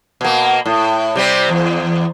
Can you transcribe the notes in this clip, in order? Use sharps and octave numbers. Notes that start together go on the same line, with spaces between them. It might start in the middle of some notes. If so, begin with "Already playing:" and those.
B2 A#3
A2
C3 G3 C4
E2